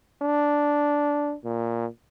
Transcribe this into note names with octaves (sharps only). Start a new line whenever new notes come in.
D4
A#2